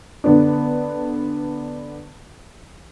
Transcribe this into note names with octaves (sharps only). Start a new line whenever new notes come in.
D3 B3 D4